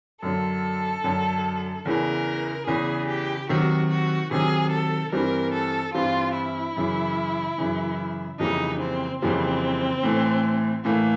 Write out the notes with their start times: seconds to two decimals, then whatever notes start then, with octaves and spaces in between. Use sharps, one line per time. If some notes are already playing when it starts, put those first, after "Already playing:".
0.22 F#2 D3 F#3 A4
1.04 F#2 D3 F#3
1.85 E2 C#3 E3 A#4
2.67 E2 C#3 E3 G#4
3.09 G4
3.49 C3 D#3 F#3 F#4
3.90 F#4
4.31 C3 D#3 F#3 G#4
4.72 A4
5.12 G2 E3 G3 C4 A#4
5.53 A4
5.94 G2 E3 G3 C4 F4
6.35 E4
6.76 F#2 C#3 E3
7.58 F#2 C#3 E3
8.39 F2 C#3 E3 G3 A#3 D#4
8.81 C4
9.22 F2 C#3 E3 G3 A#3 C4
10.03 A2 E3 A3
10.85 A2 E3 A3 A#3